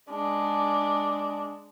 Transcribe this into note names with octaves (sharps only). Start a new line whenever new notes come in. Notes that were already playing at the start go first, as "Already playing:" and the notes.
G#3 D4